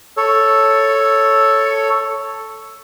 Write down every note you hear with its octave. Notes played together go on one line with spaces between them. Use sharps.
A4 C#5